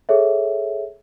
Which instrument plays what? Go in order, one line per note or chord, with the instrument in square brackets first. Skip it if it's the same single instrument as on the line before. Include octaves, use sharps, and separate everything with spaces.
[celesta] G#4 A4 C#5 E5